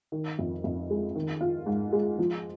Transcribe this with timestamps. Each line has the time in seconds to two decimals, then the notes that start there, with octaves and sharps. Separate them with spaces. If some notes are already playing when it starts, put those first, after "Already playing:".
0.12 D#3
0.39 F2
0.64 F2
0.90 G#3
1.15 D#3
1.41 F4
1.66 G#2
1.93 G#3
2.19 F3